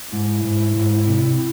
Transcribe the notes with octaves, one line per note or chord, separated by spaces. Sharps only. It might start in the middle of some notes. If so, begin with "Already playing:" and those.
G#2 E4
G#2
G#2
C3